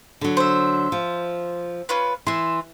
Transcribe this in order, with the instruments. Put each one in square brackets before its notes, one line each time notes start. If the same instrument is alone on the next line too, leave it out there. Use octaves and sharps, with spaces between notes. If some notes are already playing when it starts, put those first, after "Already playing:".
[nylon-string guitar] D3 F#3
[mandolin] C5 E5
[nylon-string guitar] F3
[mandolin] C#4 F4 B4
[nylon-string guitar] E3 [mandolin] E5 C6